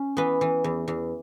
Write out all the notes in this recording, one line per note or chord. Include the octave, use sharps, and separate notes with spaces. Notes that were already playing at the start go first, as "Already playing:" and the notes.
Already playing: C#4
E3 B3 B4
E3
E2
E2